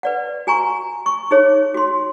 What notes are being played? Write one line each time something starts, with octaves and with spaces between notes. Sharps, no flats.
B4 D5 F#5
F#4 G#5 A#5 C#6
C#6
D#4 G#4 C#5
F#4 C6